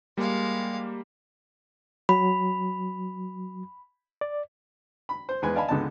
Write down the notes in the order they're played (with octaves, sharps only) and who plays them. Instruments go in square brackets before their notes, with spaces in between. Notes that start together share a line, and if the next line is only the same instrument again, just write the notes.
[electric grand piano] G3 A#3 [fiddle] G#3 F5
[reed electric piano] F#3 [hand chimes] B5
[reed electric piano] D5
[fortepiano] B5
C5
E2 G#3 B4 G#5
D5 D#5 F5 G#5 A5 B5
C#2 D3 G#3 B3 D#4 A5